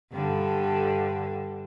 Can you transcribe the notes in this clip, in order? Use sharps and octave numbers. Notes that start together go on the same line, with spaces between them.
G2 D3 A4